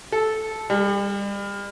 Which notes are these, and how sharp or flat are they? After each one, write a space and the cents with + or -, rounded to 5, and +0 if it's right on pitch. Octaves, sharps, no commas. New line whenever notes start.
A4 -10
G3 +35